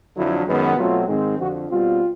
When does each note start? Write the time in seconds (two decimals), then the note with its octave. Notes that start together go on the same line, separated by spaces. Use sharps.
0.14 F2 D3 F#3 E4
0.46 F#2 D#3 G#3 B3
0.76 B2 F#3 A3 C4 F4
1.07 G#2 D#3 G#3 C4
1.38 F2 D3 F3 F#4
1.69 B2 G3 C4 F4